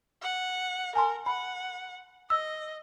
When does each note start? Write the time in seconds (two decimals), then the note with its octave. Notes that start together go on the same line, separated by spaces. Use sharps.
0.22 F#5
0.95 A#4 G#5 A5 C6
1.26 F#5 B5
2.30 D#5 E6